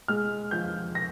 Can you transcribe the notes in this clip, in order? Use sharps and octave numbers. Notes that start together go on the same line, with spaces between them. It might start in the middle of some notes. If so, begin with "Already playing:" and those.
G#3 F6
F3 G6
A#6